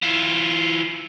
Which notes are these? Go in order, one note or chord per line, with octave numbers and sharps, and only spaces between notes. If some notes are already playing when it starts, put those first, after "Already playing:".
E3 F4